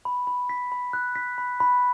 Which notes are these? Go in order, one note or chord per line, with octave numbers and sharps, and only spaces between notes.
B5
B5
B6
B5
F#6
B6
B5
B5